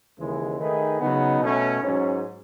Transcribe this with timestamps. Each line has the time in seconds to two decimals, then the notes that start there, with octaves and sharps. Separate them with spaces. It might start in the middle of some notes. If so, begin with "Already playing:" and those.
0.18 D#2 C#3 E3 G#3
0.58 D#3 A3 D#4 G#4 B4
0.99 C#3 F#3 B3 D#4
1.41 B2 A3 C#4
1.81 G#2 F#3 C#4